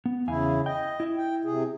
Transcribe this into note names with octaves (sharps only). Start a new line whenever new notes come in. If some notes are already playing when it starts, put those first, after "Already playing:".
B3
E2 C#3 E4 F5 G#5
D#5 G5
E4 E5
G5
C3 G#4